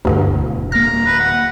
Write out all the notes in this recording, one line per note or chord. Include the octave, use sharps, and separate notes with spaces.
E1 D2 G2 D3
D1 A#3 A#5 F6
B4
F#5